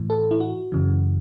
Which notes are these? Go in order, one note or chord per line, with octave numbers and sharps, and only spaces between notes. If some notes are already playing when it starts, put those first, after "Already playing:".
Already playing: A2 E3
A4
E4
F#4
F#2 C#3 E3